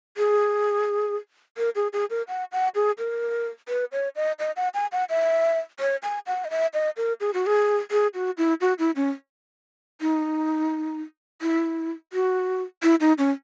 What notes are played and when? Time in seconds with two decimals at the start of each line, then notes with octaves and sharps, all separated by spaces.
0.17 G#4
1.57 A#4
1.75 G#4
1.93 G#4
2.10 A#4
2.28 F#5
2.52 F#5
2.75 G#4
2.98 A#4
3.68 B4
3.92 C#5
4.16 D#5
4.39 D#5
4.56 F#5
4.74 G#5
4.92 F#5
5.09 E5
5.80 C#5
6.03 G#5
6.27 F#5
6.45 D#5
6.50 E5
6.74 D#5
6.97 A#4
7.20 G#4
7.34 F#4
7.46 G#4
7.91 G#4
8.14 F#4
8.38 E4
8.61 F#4
8.79 E4
8.96 C#4
10.01 D#4
11.42 E4
12.13 F#4
12.83 E4
13.01 D#4
13.18 C#4